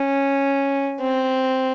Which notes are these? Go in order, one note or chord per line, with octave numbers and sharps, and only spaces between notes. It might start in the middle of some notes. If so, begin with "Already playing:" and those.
Already playing: C#4
C4